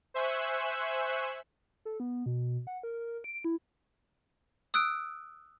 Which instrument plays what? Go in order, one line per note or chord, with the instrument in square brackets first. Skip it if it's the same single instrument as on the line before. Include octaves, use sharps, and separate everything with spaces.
[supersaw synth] C5 E5 G#5 C#6 E6 F#6
[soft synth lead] A4
B3
B2
F#5
A#4
D7
E4
[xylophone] D#6 E6 F#6 D7